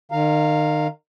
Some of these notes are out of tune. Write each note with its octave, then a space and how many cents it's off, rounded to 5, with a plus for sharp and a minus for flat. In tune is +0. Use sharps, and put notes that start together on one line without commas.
D#3 -35 F5 +0 A#5 -20